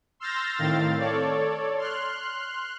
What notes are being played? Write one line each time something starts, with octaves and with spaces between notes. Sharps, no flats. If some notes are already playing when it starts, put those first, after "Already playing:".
C6 E6 F6 G6 A6 A#6
A2 D#3 C4 F5 A6
A4 C#5 D5
C6 F6 F#6